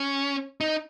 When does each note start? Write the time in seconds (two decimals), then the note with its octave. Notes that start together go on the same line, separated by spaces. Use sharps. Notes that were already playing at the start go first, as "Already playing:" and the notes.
Already playing: C#4
0.61 D#4